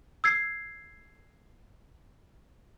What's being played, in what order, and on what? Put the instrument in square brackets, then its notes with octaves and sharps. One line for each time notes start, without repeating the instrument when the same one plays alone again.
[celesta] E6 G#6 C7